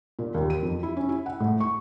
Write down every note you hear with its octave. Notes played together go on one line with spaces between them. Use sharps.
A#2
D#2
D#7
F2
E4
C#4
E4
F#5
A2
C#6